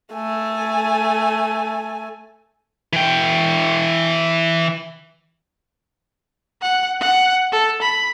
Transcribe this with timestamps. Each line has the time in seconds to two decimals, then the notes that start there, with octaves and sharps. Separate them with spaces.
0.14 A3 G#5
2.93 E3 G5
6.62 F#5
7.00 F#5
7.52 A4
7.82 B5